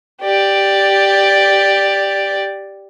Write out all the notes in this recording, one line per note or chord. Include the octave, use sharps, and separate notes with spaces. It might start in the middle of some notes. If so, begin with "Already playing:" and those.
G4 D5